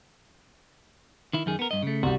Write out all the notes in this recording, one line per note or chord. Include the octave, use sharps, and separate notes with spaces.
D#3 E4
F#2 D#3 G#4
B3 A#4
G2 D#5
C#3 A3
C2 G3 F#4